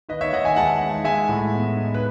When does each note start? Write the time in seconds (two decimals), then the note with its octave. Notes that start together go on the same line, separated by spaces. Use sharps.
0.09 D#3 B4 D#5
0.21 C#5 E5
0.32 D#2 D#5 F#5
0.45 E5 G#5
0.56 G#3 F#5 A5
0.81 D#4
1.04 G#3 E5 G#5
1.29 A2
1.53 B3
1.77 D#4
1.94 B4